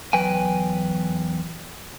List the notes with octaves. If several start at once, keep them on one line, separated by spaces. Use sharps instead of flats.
E2 F#3 B4 G5 G#5